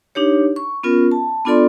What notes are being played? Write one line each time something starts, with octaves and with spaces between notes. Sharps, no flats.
D4 D#4 G4 C#5
C#6
B3 C#4 F4 A#4
A5
B3 D4 F4 A4 D5 C6